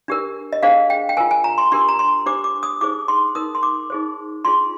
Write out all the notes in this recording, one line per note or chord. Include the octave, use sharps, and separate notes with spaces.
D4 G4 A#4
D#5
D4 G#4 C5 F5
G5
G5
F4 A#4 G#5
G#5
A#5
C6
D4 G4 A#4 C6
A#5
C6
D4 G4 C5 D6
D6
D#6
D#4 G#4 C5 D6
C6
D#4 A#4 D#6
C6
D6
D#4 G#4 C5
D4 F4 G#4 C6